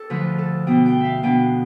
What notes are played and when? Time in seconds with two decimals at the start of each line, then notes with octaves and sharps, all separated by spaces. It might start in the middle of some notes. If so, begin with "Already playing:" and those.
Already playing: G4 A4
0.10 D2 D3 F3 B4
0.38 A4
0.67 B2 B3 D4 G5
0.86 G5
1.00 E5 F5
1.23 B2 B3 D4 G5